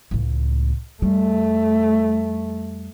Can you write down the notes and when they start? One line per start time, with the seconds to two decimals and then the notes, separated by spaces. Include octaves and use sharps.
0.11 C#2 A2
1.02 F2 G3 A3